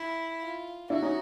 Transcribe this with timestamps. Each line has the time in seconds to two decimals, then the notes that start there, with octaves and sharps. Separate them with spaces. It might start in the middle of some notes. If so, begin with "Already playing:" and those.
Already playing: E4
0.41 F4
0.90 D4 E4 F#4
1.02 C#4 D#4